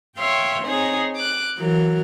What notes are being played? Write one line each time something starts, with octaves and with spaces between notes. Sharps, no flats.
C#5 E5 F5 G5 C6
C4 D#4 G#4 C#5
D6 F#6
E3 F#3 A#4